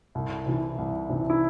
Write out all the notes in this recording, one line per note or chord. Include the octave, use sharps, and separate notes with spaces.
C2
C3 E3
C2
C3 E3
E4